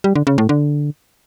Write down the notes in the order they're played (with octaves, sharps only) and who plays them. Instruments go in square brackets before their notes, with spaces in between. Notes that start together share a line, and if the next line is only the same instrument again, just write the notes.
[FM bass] G3
D3
C#3
A2
D3